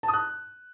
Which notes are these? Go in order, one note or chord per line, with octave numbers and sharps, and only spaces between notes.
A5
D#6
F#6